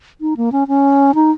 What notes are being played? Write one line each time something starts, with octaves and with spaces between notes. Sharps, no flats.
D#4
A#3
C#4
C#4
D#4